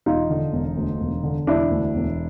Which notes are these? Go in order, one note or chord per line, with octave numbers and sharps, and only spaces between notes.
E1 D#4 F4
D3
E1
D2
E1
D3
E1 D4 E4
D2
E1